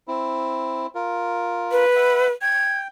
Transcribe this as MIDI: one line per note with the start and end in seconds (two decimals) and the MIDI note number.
0.08 0.87 60
0.08 0.87 64
0.95 1.85 65
0.95 1.85 70
1.72 2.32 71
1.96 2.27 76
1.96 2.27 78
1.96 2.27 83
2.42 2.88 79
2.42 2.79 92